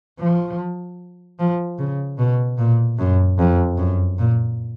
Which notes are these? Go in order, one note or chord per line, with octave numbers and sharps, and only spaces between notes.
F3
F3
C#3
B2
A#2
F#2
F2
F#2
A#2